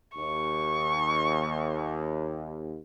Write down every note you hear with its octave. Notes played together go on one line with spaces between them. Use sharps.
D#2 C#6